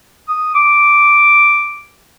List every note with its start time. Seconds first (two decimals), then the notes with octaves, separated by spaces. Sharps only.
0.28 D#6
0.54 D6